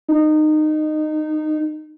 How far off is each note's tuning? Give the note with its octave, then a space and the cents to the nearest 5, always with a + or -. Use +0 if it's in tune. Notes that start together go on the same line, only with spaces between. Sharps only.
D#4 -20